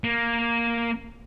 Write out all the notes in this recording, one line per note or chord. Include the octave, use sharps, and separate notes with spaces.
A#3